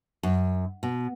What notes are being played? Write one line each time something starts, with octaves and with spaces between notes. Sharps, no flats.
F#2
B2